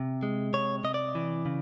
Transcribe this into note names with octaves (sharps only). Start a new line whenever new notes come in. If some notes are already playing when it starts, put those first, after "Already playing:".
Already playing: C3
G#3
C3 C#5
C3 D#5
D5
E3
C#3